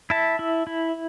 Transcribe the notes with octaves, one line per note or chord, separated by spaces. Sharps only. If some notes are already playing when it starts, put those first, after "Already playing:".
E4 E5 A5
E4
E4